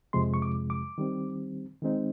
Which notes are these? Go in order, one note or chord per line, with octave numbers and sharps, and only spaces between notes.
F2 C3 F3 G#3 C6
C#6
D6
D6
D#3 G3 C4
D#3 G#3 C4 D#4